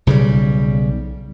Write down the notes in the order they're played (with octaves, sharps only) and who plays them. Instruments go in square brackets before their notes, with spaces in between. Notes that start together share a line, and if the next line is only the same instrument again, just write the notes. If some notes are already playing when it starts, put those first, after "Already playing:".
[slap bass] B1 C#3 F3 G3